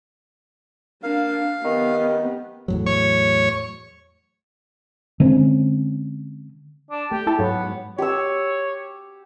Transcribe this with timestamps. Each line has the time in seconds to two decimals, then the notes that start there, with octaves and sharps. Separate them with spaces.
1.03 A#3 D4 F5
1.64 D#3 B3 G4
2.68 E2 A2 F#3
2.86 C#5
5.20 D3 G#3 C4 C#4
6.91 D4
7.12 A3 G4
7.27 E4 A4 A5
7.39 G#2 F#3 B3 C#5
7.98 G4 C#5 E6